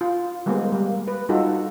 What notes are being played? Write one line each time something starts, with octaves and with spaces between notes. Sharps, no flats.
F4
G3 G#3 A#3 B3 G#4 C5
G3 A#3
B4
G3 D#4 F4 F#4 G#4 A4